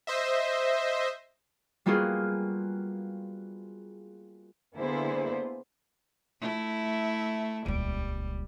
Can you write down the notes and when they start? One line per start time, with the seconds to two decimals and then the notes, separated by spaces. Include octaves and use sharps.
0.07 C5 D#5 E5
1.86 G3 A#3 B3 F4 F#4 G#4
4.77 D3 A#3 B3 E4 G#4 C5
6.41 A3 E4
7.66 D#1 C#2 G3